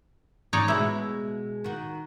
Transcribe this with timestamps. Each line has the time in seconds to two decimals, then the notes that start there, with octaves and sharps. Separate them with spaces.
0.53 G#2 D#4 C#5 D5
0.68 B2 G#3 E4
1.64 D#3 F#4